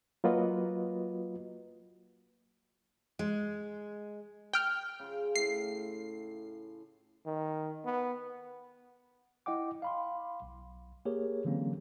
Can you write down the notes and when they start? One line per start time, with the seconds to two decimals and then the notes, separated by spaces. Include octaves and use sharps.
0.24 F#3 A#3 F4 F#4 B4 D#5
3.19 G#3
4.53 G5 F6
4.99 C#3 F4
5.36 A2 C7
7.26 D#3
7.85 B3
9.46 E4 D#5 F#5 G5 D6
9.82 F5 B5 C6
10.42 B1
11.05 A#3 G4 G#4 A#4 C#5
11.45 D3 E3 F#3 A#3 C4 C#4